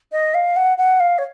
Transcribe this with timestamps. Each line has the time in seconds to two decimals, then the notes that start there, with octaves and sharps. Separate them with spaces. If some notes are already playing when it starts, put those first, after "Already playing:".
0.12 D#5
0.34 F5
0.56 F#5
0.78 F#5
1.00 F5
1.18 C#5